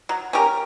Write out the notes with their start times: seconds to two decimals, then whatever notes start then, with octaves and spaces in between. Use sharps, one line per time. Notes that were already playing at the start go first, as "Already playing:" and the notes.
0.09 F#3
0.33 C#4 G4 A#4